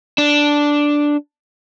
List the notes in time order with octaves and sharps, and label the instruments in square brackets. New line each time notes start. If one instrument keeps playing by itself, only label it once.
[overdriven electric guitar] D4